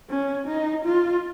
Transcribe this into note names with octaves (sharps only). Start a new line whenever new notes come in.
C#4
D#4
F4